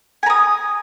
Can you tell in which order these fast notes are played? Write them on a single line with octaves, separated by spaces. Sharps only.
G#5 A#5 D#6